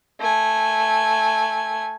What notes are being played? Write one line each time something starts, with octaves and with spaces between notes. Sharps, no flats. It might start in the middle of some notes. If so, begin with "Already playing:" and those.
A3 G#5